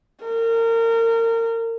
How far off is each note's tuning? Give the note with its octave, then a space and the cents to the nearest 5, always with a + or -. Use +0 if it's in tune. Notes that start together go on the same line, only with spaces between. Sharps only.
A#4 -30